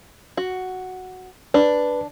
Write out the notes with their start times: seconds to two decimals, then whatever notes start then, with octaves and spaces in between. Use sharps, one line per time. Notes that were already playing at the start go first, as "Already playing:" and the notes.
0.37 F#4
1.54 D4 B4